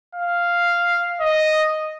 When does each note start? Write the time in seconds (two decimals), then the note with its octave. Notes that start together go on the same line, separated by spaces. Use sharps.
0.15 F5
1.21 D#5